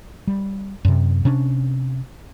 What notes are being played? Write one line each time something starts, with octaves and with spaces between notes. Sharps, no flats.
G3
F#2 C3
C3 C#4 D4